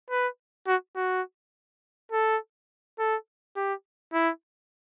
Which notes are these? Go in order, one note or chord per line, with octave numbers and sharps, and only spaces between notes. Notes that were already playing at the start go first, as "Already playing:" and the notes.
B4
F#4
F#4
A4
A4
G4
E4